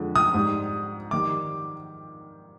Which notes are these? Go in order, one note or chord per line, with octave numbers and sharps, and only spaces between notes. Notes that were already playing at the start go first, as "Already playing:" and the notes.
Already playing: F2 D3 G#3
D#6
G#2 G3
D#3 G3 D6